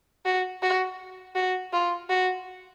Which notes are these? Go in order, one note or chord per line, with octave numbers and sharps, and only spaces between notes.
F#4
F#4
F#4
F4
F#4